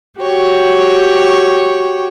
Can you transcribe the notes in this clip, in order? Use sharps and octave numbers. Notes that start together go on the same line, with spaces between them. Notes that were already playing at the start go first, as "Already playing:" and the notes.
F#4 G4 C#5 G5